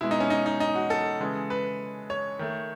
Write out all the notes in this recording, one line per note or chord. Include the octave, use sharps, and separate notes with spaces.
B2 G#3 E4
D#4
C#4
D#4
D#4
D#4
F#4
A4
C#3 E3 G#3
B4
C#5
D#3 A3